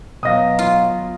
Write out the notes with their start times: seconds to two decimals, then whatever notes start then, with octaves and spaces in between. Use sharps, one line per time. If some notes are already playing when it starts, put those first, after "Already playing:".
0.23 B2 F#3 B3 D#5 F5 D#6 A#6
0.59 F4